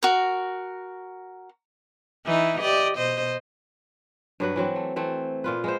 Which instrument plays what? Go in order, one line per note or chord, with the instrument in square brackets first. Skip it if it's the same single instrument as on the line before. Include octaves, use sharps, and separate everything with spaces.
[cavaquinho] F#4 A#4
[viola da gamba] E3 D#4 E4
G4 D5 D#5
B2 C5 D#5
[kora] G2 F#3 B4
E3 F#3 C4
A3
E3 A3 C4
A#2 F4 B4
G#3 B3 C5